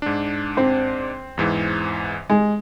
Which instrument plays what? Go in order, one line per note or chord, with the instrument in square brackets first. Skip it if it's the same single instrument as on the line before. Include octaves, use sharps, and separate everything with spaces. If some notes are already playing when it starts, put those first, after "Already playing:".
[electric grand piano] G#2 D4
[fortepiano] C4
[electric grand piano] E2 G#2 E3
[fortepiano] G#3